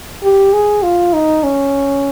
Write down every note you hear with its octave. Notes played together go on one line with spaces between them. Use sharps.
G4
G#4
F4
D#4
C#4